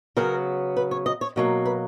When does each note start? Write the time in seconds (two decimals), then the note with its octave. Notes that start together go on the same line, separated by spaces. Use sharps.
0.17 C#3 F#3 B3 A#4
0.76 B4
0.91 C#5
1.06 D#5
1.21 C#5
1.36 B2 F#3 A#3
1.65 B4